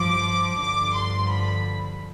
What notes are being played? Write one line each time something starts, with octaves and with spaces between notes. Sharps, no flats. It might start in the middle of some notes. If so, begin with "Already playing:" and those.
Already playing: G2 F3 D6
G2 D3 F3 D6
C6
B5